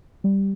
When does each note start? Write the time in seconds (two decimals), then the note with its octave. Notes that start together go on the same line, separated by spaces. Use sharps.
0.24 G3